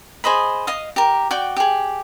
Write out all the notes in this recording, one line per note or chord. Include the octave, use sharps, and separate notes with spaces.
G#4 C5 D#5 B5
D#5 F5 D#6
G4 A#4
F#4 D5 G5
G4 G#4